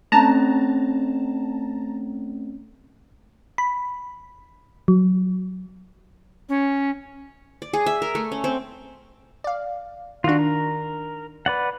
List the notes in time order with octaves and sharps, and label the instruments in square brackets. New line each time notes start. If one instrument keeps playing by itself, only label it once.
[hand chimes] A3 C4 C#4 [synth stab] A5 A#5
[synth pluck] B5
F#3
[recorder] C#4
[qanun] D5
G#4
E5
A#4
A3
C#4
C4
[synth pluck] D5 F5
[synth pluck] D#3 D4 [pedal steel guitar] F4 F#4
[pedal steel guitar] A#4
B4 D5 F#5